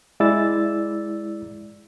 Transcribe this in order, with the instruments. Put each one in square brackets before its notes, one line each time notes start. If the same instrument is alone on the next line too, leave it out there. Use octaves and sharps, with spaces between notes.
[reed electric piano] G#3 E4 D5 E6 A6